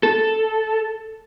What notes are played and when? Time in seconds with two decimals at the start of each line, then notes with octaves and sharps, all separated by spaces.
0.03 A4